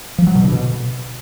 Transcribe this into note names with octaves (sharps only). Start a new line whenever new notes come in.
F3
F#3
B2
D3
B2